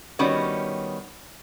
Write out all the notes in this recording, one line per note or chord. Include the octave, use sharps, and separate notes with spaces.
D#3 G3 B3 C#4 F#4 C#5